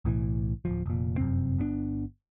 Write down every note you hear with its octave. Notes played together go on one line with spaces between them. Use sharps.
B1 A2 E3
D1 B1 F3
F1 A#2
F1 F#2 C3 C4
G1 B3 C4 D4